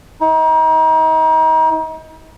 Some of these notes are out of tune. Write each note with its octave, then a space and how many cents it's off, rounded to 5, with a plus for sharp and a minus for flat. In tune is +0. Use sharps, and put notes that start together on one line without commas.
D#4 +35